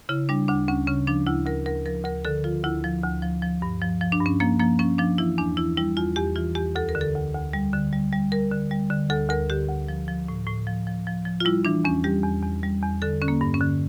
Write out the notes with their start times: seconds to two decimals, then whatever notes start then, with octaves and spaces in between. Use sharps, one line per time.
0.09 C#3 E4
0.29 G3 D4
0.48 D2 D4
0.68 D2 C#4
0.87 C#3 C#4
1.07 F3 D4
1.27 D2 E4
1.46 D2 A#4
1.66 D2 A#4
1.85 F3 A#4
2.05 D2 A#4
2.25 D3 A4
2.44 F3 F4
2.64 D2 E4
2.84 F3
3.03 D2
3.22 F3
3.42 F3
3.62 G2
3.82 F3
4.01 F3
4.12 D4
4.20 G2
4.26 C#4
4.40 F3 A#3
4.60 F3 A#3
4.79 F3 C#4
4.98 F3 D4
5.18 E3 E4
5.38 E2 D4
5.57 E3 E4
5.77 G3 E4
5.97 E2 F4
6.16 E2 G4
6.36 E3 F4
6.55 E2 G4
6.76 D2 A4
6.89 A#4
6.95 D3
7.01 A4
7.14 D2
7.34 D2
7.53 G3
7.73 D3
7.92 G3
8.13 G3
8.32 G3 A#4
8.51 D3
8.71 G3
8.90 D3
9.10 D2 A4
9.29 D2 A#4
9.50 D3 G4
9.69 D2
9.88 F3
10.08 F3
10.28 A2
10.47 A2
10.67 F3
10.87 F3
11.07 F3
11.25 F3
11.40 F4
11.45 G3 E4
11.65 E3 D4
11.85 E2 C#4
12.04 G3 G4
12.24 E2
12.43 E2
12.63 G3
12.83 E2
13.02 D3 A4
13.22 D3 C#4
13.28 A#3
13.41 G2
13.54 C#4
13.61 D3